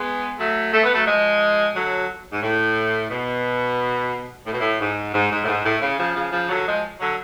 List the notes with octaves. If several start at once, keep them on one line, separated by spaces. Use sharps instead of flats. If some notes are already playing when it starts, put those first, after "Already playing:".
Already playing: G#3 B3
F#3 A3
A3
B3
F#3 A3
F3 G#3
D3 F#3
G#2
A2
B2
A2
B2
A2
G#2
G#2
G#2
A2
G#2
A2
C#3
C#3 F3
C#3 F3
C#3 F3
D3 F#3
F3 G#3
D3 F#3